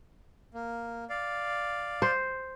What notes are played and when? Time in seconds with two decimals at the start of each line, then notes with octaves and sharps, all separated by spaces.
0.54 A#3
1.10 D5 F5
2.02 C5